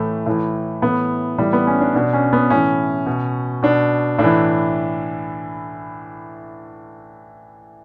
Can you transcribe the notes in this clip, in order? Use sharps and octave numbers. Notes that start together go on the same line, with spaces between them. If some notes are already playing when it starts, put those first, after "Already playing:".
Already playing: A2 E3 A3
A2 E3
A2 E3 B3
A2 E3 G3
B3
C#4
D4
B2 D4
C#4
B3
A2 E3 C#4
B2
B2 D4
A2 D4
E3